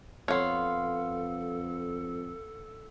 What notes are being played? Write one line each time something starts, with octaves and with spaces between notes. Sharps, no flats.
F2 B3 A4 C#5 F5 C6